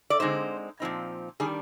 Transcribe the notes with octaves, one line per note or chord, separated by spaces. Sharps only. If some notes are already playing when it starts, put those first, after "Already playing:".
D5
D3 G#3 C4 D#4 C5
A#2 F3 C4 D#4
D#3 G3 D4 G#4